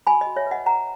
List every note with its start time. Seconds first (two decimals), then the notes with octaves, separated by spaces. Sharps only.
0.07 F#4 G#5 B5
0.21 D#5
0.27 F#4
0.36 C#5 E5
0.46 B4
0.51 D#5 F#5
0.66 B4 F#5 A#5